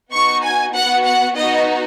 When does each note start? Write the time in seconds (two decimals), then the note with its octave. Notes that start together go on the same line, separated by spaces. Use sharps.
0.12 B3 D#4 F#4 C#6
0.42 G#5
0.73 B3 F#4 F#5
1.05 F#5
1.35 B3 D#4 F#4 D#5